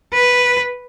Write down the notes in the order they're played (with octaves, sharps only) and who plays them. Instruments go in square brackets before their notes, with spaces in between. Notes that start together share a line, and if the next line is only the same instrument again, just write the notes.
[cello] B4